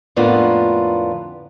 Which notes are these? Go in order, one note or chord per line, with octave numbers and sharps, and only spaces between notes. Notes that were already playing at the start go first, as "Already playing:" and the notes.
F2 A2 D3 A#3 B3 F4